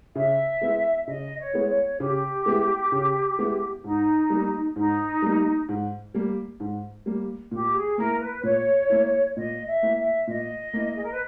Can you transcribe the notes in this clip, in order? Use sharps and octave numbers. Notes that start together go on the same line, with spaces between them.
C#3 E5
G#3 B3 E4
C#3 D#5
C#5
G#3 B3 E4
C#5
C#3 G4
G#3 B3 E4
C#3
G#3 B3 E4
G#2 D#4
G3 A#3
G#2 D#4
G3 A#3
G#2
G3 A#3
G#2
G3 A#3
A#2 G4
G#4
A#3 E4 A#4
B4
A#2 C#5
A#3 E4
A#2 D#5
E5
A#3 E4
E5
A#2 D#5
A#3 E4
G#4
A#4
B4